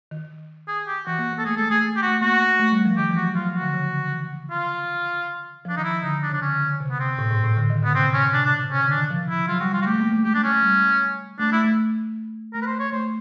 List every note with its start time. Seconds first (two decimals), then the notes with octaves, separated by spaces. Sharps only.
0.11 D#3
0.68 G#4
0.87 G4
1.06 E3 F#4
1.19 A#3
1.33 A#3
1.38 A4
1.45 A3 G#4
1.57 G#3 A4
1.70 A3 G#4
1.96 G4
2.02 F#4
2.08 A3
2.21 A#3 F#4
2.59 A3
2.72 G3
2.85 F3
2.97 D#3 G4
3.11 E3
3.17 F#4
3.23 F#3
3.35 F#3 F4
3.49 F3
3.55 F#4
3.62 D3
3.74 C#3
3.93 D3
4.12 E3
4.50 F4
5.65 F3
5.69 D4
5.77 D#3 D#4
5.84 E4
5.90 D#3
6.03 D3 D#4
6.23 D4
6.30 C#3
6.34 D4
6.41 D3 C#4
6.61 D3
6.80 C3
6.91 B3
6.99 C3 C4
7.19 A2
7.31 G#2
7.44 A2
7.57 D3
7.70 D#3
7.82 D3 B3
7.95 C3 C4
8.08 C3
8.14 C#4
8.20 B2
8.33 C3 D4
8.45 C#3 D4
8.59 C3
8.71 C3 C#4
8.84 D3
8.90 D4
8.97 D#3
9.10 F3
9.30 E4
9.48 F#3 F4
9.60 G3 F#4
9.73 G3 F4
9.82 F#4
9.86 A3 G4
10.00 A#3
10.12 A3
10.24 G#3 G4
10.35 D4
10.44 C#4
10.62 G3
11.39 A3 D4
11.52 A3 E4
11.64 A3
12.54 A3 A#4
12.62 B4
12.66 C5
12.80 C#5
12.92 A3 C5